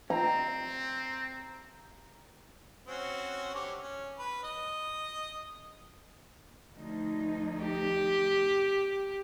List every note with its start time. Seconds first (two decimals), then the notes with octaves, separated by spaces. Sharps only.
0.10 C4 A#5
2.86 C4 C#4 F#4
3.55 D3 G4 C#5
3.81 C#4
4.19 B4
4.44 D#5
6.76 D2 F3 D#4
7.64 G4